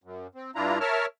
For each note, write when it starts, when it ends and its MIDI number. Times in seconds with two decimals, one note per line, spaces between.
0.04 0.27 42
0.35 0.51 60
0.55 0.78 43
0.55 0.78 62
0.55 0.78 64
0.55 0.78 65
0.55 0.78 82
0.80 1.06 70
0.80 1.06 73
0.80 1.06 76
0.80 1.06 81
0.80 1.06 89